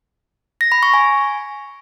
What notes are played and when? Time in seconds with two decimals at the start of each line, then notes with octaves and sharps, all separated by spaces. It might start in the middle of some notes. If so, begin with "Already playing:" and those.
0.61 A#6
0.72 B5
0.83 C#6
0.94 G#5